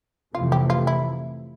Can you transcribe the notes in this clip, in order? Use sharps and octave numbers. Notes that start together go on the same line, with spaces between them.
F2 C3 E3 A3 F4
G4
F4
E4